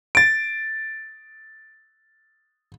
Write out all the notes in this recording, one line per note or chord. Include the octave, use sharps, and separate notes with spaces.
A6 D7